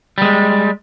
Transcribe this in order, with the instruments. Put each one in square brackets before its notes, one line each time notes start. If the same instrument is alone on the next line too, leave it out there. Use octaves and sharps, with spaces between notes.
[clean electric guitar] G3 G#3